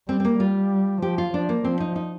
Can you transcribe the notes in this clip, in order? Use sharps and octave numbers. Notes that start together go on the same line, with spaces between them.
G3 C4
C4
A#3
G3 F4
F3 G4
F4
F3 D4
A#3
F3 C4
D#4
D#4